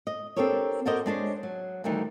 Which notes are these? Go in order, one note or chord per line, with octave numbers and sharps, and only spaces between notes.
D#5
C4 D4 G4 A4 A#4 C#5
F#4 A4 A#4 C5 D5 D#5
G#3 D4 C5 C#5
F#3
D2 D#3 E3 G3 D#4